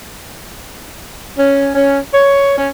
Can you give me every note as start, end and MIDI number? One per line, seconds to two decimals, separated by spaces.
1.37 1.69 61
1.75 1.98 61
2.13 2.52 73
2.57 2.68 61